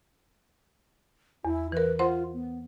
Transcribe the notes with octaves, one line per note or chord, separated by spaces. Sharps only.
E2 E4
E3 A#4 B4
F4 C5 F#5 C6
B3